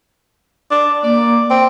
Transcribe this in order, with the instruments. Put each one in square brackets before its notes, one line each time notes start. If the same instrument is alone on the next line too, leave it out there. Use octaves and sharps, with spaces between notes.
[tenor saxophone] D4
[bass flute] A#3 [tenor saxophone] D5
[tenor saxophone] C4